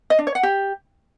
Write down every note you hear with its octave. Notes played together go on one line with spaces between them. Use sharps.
D#5
D4
C#5
F#5
G4